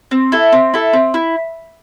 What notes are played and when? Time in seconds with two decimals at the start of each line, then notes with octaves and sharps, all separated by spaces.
0.11 C4
0.32 E4 A4
0.52 C4
0.74 E4 A4
0.93 C4
1.14 E4